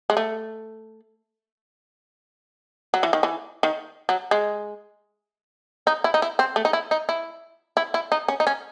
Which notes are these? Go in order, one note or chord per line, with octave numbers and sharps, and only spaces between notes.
G#3
A3
F#3
E3
D#3
E3
D#3
F#3
G#3
D#4
E4
D#4
E4
C4
A3
D#4
E4
D#4
E4
E4
E4
D#4
C#4
D#4
C#4